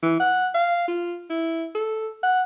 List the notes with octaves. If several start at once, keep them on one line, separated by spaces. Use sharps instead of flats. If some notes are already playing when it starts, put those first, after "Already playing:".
E3
F#5
F5
F4
E4
A4
F#5